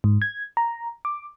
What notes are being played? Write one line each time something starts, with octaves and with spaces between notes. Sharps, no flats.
G#2
G#6
A#5
D6